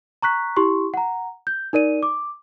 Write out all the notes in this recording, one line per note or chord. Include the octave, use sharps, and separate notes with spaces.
A#5 C#6 F#6 B6
E4 G4 C6 C#6
F#5 A#5
G6
D#4 A#4 D5 D#7
D6